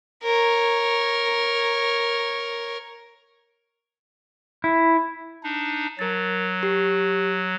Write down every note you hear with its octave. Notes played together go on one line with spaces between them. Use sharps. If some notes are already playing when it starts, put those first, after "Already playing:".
A#4 C#5
E4
D4 D#4
F#3 A#4 A6
G4